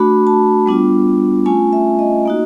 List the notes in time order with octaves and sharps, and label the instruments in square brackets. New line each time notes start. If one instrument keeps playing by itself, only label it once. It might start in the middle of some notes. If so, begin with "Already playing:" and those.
Already playing: [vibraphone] A3 D4 F#4 B5
A5
G3 B3 D4 F4
A3 C#4 F4 G#5
E5
D#5
A#3 D#4 F#4